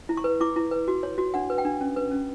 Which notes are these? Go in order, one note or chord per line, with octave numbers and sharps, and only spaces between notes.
E4
C#6
B4
E4 D6
E4
B4
F#4
C#5
F#4
D4 F#5
B4
G5
D4
C#4
B4
C#4